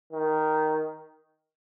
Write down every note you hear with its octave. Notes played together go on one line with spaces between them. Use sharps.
D#3